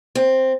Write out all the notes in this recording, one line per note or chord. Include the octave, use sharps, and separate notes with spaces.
C4